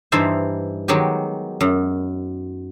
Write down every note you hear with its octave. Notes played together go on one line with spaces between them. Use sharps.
G2 E3 D#4 C5 E5
D#3 F#3 G#3 B3 G4
F#2